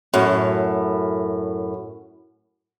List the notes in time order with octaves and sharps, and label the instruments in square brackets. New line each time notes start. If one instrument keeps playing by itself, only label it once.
[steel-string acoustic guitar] F#2 A2